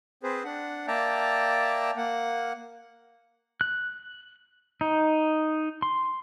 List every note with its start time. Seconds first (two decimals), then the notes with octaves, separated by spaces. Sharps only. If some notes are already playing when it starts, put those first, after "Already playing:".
0.23 C4 G#4 B4 C5
0.44 D4 F#5
0.87 A#3 D5 E5 G5 A5 A#5
1.97 A#3 F#5
3.61 F#6
4.81 D#4
5.82 C6